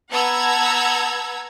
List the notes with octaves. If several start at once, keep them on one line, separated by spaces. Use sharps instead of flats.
B3 F#5 A5 A#5 E6 G#6